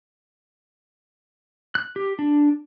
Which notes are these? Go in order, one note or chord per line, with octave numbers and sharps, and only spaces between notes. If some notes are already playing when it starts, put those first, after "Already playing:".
F#6
G4
D4